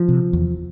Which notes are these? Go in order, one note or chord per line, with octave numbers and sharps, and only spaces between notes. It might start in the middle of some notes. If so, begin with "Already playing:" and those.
Already playing: F3
C3
E2